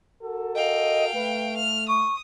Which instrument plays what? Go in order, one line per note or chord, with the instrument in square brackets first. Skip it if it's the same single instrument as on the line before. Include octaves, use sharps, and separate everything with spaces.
[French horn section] F#4 A4 A#4
[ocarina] D#5 [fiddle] F5 G5
[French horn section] A3 [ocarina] B4
[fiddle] F6
[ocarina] C#6 [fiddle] D#6